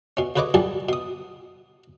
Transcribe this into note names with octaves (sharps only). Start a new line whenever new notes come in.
B2 C#4
D2 C#3 B4 C#5 D#5 D6
A#2 F#3 G3 G#4 A5
B2 D#6